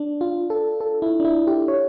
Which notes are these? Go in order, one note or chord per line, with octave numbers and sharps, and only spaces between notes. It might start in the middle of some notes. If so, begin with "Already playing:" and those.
Already playing: D4
F4
A4
A4
E4
D4
E4
G4
C#5